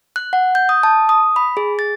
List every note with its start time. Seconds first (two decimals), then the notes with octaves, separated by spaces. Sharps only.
0.16 F#6
0.33 F#5
0.55 G6
0.69 D#6
0.83 A5
1.09 D#6
1.36 B5
1.57 G#4
1.79 A6